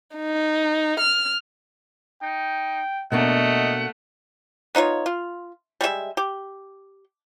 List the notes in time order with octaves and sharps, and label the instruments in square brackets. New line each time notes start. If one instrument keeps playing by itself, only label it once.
[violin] D#4
F6
[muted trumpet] D#4 [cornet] G5
[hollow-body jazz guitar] B2 A#3 D4 [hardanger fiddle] A3 [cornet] D#5 [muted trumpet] F#5
[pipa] B3 D#4 F4 C#5
F4
G3 G#3 F#4 E5
G4